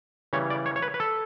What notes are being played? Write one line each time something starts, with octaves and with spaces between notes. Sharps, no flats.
C#3 E3 G3 C#5
D5
C#5
C#5
B4
B4
A4